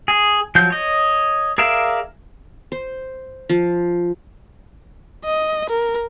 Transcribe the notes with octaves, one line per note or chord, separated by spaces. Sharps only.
G#4
F3 F#3 G6
C#5 D#5
G#4 A#4 D5 E5 F5
C5
F3
D#5
A#4